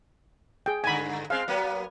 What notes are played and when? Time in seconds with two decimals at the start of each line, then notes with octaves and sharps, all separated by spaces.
0.66 G#4 G5
0.84 G2 D3 G#5 B5
1.30 G#3 C4 F5
1.48 F#3 A#3 B3